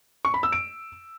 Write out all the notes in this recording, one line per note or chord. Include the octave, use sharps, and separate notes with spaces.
C#6
B5
E6
D7